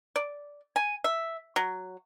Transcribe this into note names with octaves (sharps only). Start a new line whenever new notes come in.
D5
G#5
E5
F#3